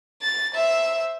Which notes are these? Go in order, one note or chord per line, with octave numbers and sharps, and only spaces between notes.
A6
C5 E5